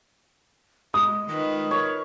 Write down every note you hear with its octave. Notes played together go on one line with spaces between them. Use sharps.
G#3 D#6
D#3 G#3 F4 B4
A#4 C#5